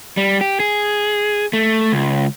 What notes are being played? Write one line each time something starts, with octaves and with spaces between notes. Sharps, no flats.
G3
G4
G#4
A3
C#2